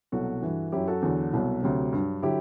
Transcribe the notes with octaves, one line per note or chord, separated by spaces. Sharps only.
C2 B2 F#3 F#4 A4
G2 E3
F#2 F#3 E4 G4
F#4 A4
E2 D3 F#3
C2 B2 F#3
D2 C3 F#3
G2
F#3
D3 F#3 E4 G4